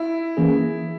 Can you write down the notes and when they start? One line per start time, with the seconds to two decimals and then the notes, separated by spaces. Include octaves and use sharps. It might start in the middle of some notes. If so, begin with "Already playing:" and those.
Already playing: E4
0.37 E3 A#3 C#4 G#4